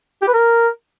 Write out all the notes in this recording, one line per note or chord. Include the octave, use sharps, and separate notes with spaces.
G4
B4
A#4